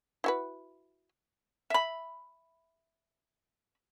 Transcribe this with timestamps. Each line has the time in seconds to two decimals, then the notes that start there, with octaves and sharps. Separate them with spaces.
0.24 E4 F#4 B4
1.70 E5 B5